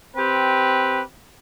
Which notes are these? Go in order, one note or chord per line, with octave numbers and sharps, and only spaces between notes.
C4 G4 B4